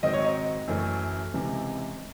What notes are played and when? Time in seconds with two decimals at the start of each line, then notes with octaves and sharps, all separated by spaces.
0.03 G#2 D#3 F#3 C4 D#5
0.13 C#5
0.25 D#5
0.68 F#2 E3 A3 C#4
1.34 C#2 C3 E3